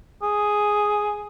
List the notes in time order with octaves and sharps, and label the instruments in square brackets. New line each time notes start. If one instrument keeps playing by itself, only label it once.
[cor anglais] G#4